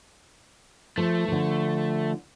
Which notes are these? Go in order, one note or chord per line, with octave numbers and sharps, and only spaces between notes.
F3 A3
D3 F3